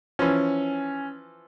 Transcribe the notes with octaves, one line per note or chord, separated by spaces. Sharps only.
E3 F3 C#4